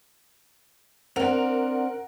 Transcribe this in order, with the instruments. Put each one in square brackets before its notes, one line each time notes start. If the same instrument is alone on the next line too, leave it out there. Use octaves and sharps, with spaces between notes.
[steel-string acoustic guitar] C4 D4 [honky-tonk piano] A#4 F#5 F7